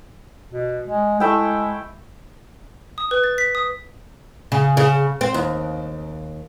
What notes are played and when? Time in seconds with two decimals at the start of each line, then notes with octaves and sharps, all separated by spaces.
0.52 B2
0.84 G#3
1.20 G#3 A3 E4 G5
2.98 D#6
3.11 B4
3.24 A6
3.38 B6
3.55 D#6
4.52 C#3
4.77 C#3
5.21 C4
5.34 D#2